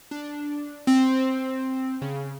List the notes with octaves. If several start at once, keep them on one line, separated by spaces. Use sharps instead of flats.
D4
C4
C#3